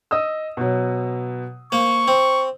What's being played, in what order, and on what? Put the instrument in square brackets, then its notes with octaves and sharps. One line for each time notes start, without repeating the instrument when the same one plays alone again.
[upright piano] D#5 D#6 E6
B2 F#3
[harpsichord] A#3 [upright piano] C5 [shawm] C#6
[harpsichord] C4